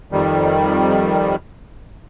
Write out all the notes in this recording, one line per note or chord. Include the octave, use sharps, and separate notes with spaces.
F2 D#3 G3